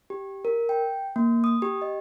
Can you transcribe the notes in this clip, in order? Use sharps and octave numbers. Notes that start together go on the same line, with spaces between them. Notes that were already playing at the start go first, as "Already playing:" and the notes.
G4
A#4
G5
A#3
D#6
G4
D#5